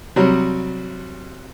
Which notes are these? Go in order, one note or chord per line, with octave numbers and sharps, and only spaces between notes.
C3 F#3 G3